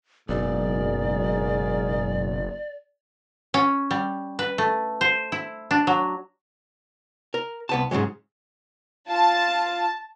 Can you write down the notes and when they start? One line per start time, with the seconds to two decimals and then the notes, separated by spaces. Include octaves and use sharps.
0.29 F#1 B1 G#2 G#4 A#4 D5
3.54 C#4
3.91 G3
4.39 B4
4.58 A3
5.01 C5
5.32 E4
5.71 D4
5.87 F#3
7.34 A#4
7.69 C2 B3 A5
7.91 G#2 C#3 E3 F#3 G#3
9.09 F4 F5 A5